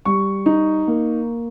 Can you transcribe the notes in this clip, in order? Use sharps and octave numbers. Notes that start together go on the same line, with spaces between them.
G3 C#6
D#4
A#3